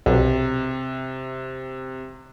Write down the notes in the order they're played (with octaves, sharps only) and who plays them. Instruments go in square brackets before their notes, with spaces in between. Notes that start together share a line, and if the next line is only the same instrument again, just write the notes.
[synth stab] B1 [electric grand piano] C3